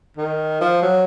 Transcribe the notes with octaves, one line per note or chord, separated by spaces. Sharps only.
D#3
F3
F#3